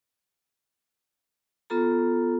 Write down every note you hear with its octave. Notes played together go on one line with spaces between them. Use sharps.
B3 F4 A4 A#5